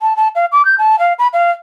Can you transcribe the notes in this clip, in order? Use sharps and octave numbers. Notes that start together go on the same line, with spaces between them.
A5
A5
F5
D6
G6
A5
F5
B5
F5